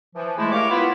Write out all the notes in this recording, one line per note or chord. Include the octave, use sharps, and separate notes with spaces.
E3 F3
G#3 A3 E4
G4 A#4 C#5 F5 C#6 D6
B3 E4 F4